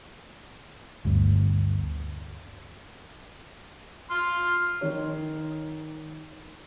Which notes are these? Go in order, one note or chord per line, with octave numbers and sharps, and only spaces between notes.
G1 D2
C6 F6
D#3 D#4 C#5